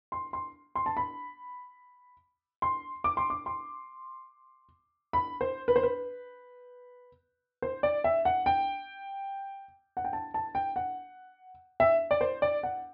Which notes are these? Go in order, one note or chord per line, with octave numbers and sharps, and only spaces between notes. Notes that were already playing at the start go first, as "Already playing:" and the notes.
C6
C6
C6
A5
B5
C6
D6
C6
D6
C6
B5
C5
B4
C5
B4
C5
D5
E5
F#5
G5
F#5
G5
A5
A5
G5
F#5
E5
D5
C5
D5
F#5